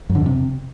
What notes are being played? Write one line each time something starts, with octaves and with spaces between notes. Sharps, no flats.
F#2
D3
F2
C3